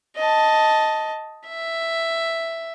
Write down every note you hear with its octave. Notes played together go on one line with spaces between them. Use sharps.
D#5 A5
E5